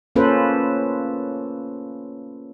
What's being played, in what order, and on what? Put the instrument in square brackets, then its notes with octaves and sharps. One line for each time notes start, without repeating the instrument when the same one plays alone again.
[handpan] A#3 C#4 F4 A4 B4 C5